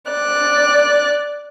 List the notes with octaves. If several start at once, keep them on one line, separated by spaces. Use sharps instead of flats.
D5 F#6